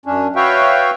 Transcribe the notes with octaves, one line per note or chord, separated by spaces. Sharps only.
F#2 C#4 D4
F#4 B4 C#5 E5 F5 G5